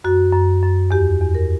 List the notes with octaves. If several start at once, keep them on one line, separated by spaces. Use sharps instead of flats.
F#2 F#4
F#2
F#2
E2 G4
E2
A#4